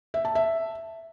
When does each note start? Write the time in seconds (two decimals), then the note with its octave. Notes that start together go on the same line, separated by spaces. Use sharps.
0.14 E5
0.25 A5
0.35 E5